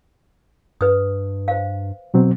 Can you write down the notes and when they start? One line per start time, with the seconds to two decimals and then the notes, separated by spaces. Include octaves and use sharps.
0.81 G2 B4 D#6
1.48 C5 F5
2.14 B2 F#3 C4